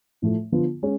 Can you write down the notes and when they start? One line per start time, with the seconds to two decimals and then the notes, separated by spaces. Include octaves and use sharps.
0.22 A2 F3 A3
0.52 D3 F3 B3 F4
0.82 G#3 C#4 G#4